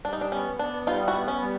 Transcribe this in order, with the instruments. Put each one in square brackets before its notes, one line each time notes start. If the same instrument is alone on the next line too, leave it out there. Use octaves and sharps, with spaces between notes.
[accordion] G3 [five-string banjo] D4
[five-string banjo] D#4
D4
[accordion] B3 [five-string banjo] C#4
[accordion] B3 [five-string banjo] D4
[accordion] G3 [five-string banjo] D#4 F4
[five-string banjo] E4 F#4
[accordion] B3
[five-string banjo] C#4
[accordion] G3